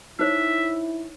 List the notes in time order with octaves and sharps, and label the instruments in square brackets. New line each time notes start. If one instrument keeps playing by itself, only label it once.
[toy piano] D#4 C5 C#5 [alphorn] E4 [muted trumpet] E5